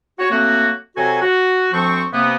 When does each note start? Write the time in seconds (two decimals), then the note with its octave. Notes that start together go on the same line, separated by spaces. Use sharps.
0.19 F#4 C#5
0.31 F#3 A3 A#3 C4 F#4
0.97 C3 F#3 F#4 A4 G#5
1.21 F#4
1.72 D2 F3 C4 C#6
2.12 C3 A#3 B3